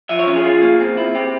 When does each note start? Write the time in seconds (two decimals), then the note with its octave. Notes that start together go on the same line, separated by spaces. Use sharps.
0.09 F3 E5
0.19 C#5
0.27 C#4
0.36 G#4
0.44 F4
0.62 A#3
0.80 C4
0.97 E4
1.15 C4 G4